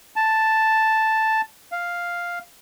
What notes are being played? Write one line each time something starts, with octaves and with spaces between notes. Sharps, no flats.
A5
F5